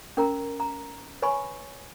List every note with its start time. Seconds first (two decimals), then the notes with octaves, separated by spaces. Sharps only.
0.17 C#4 A#4 A#5
0.60 A#5
1.22 B4 C#5 G#5 B5 C#6